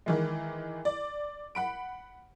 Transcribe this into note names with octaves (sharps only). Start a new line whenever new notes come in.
D#3 E3 G#3
D5
F#5 B5 D7